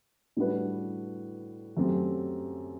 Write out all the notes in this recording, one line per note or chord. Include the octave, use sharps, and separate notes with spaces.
A2 G3 D4 F#4 B4
F#2 F#3 A3 C4 G4